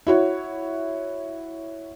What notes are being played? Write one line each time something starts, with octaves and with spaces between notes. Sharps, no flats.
E4 F#4 C#5